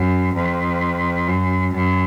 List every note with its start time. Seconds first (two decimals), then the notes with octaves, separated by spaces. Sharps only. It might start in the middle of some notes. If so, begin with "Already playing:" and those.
Already playing: F#2
0.35 F2
1.28 F#2
1.74 F#2